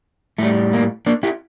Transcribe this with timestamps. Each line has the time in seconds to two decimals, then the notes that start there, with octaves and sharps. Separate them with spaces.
0.38 A2 G3 A3
0.73 A#3
1.06 A#3 D4
1.23 E4 G4